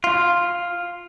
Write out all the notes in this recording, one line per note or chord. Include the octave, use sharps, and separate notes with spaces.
F4